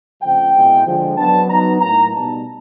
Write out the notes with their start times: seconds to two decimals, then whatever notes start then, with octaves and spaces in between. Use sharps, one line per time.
0.22 C#3 F3 A3 C4 G5
0.54 B2 G#3 C4 E4
0.86 D3 F3 G#3
1.18 F#3 B3 D4 A5
1.49 F#3 B3 D#4 A#5
1.81 A2 F#3 A#3 D#4 A#5
2.12 B2 G3 B3 D#4 A5